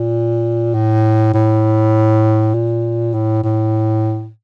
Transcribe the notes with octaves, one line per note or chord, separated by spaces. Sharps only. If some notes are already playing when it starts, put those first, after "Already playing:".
Already playing: A#2
A2
A2
A#2
A2
A2